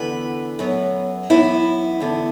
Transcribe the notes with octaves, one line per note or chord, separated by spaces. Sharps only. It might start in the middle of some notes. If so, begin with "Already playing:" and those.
Already playing: E2 D3 B3 B4
F#2 F#3 B3
F#2 E3 B3 E4
E2 D3 B3